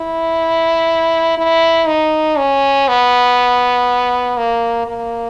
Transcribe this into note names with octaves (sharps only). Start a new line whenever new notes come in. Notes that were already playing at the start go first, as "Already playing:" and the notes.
Already playing: E4
E4
D#4
C#4
B3
A#3
A#3